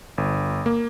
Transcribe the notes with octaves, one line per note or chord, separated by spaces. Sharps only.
G1
A#3